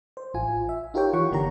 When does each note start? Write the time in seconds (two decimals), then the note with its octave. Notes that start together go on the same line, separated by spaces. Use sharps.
0.17 C5
0.34 A1 F4 G#5
0.69 E5
0.94 D#4 F4 G4 A#4 C#5 G5
1.13 E3 F#5 C#6
1.31 G1 D3 A#3 G4 C#5 A#5